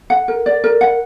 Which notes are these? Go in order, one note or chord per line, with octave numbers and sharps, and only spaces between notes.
F#5
A#4
D5
A#4
F#5